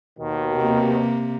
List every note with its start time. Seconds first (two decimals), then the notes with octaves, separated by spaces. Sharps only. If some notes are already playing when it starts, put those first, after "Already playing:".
0.19 D#2 B2 D#3
0.57 C3 A#3